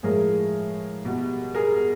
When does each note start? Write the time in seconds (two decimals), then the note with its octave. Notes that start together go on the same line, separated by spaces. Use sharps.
0.03 A2 F3 G#3 G#4 A#4
1.05 B2 G3
1.54 G#4 A#4